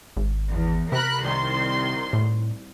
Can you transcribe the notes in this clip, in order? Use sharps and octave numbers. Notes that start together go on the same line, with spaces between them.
G#1
E2
C3 A#4 B5 F#6
C2 D#3 C6
A2